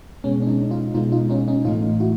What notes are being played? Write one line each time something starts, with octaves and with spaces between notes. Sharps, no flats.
B2 G#3 B3 C#4
D4
C#4 D#4
D#4 F4
B2 G#3 B3 D#4 F4
D#4 F4
C#4 D#4
C#4 D#4
A2 E3 A3 D#4 F4
E4 F#4